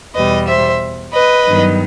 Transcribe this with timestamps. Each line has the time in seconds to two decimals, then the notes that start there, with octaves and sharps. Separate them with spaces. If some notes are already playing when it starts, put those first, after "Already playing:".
0.15 E2 B2 G3 B4 D#5
0.48 C5 E5
1.14 B4 D#5
1.46 G2 D#3 F#3 B3